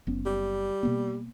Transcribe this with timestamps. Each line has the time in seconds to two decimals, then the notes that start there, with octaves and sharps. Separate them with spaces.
0.07 F#1 B3 C#4
0.26 G3
0.83 B2 A#3 B3